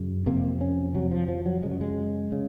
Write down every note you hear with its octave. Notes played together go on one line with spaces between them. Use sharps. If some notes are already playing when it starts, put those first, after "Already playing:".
Already playing: F#2 C#3
F2 C3 A#3
C#4
F2 C3 F#3
F3
F3
F#3
F#2 C#3 G#3
F#3
G#3
C#3